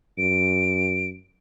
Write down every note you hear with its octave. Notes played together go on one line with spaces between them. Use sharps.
F#2 D7